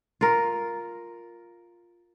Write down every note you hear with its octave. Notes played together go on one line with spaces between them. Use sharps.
F4 A#4